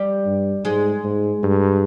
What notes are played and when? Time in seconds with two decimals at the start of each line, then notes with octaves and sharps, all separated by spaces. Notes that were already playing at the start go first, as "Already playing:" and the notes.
Already playing: G3 G4
0.26 G2
0.65 G#2 G#3 G#4
1.04 G#2
1.43 G2